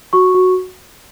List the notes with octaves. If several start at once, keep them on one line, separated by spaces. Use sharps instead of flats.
F#4 C#6
F#4